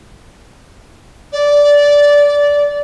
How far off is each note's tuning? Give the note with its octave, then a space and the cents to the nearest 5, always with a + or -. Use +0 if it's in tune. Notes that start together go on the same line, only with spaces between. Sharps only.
D5 -15